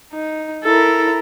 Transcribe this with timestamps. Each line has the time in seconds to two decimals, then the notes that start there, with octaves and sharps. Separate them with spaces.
0.13 D#4
0.64 E4 A4 A#4